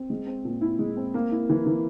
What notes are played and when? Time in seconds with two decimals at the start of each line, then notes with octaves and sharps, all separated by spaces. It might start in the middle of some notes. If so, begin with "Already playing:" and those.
Already playing: C4
0.10 G#3
0.27 C4
0.45 A#2
0.61 E4
0.79 G#3
0.96 C4
1.14 A#3
1.31 E4
1.49 E3
1.66 E3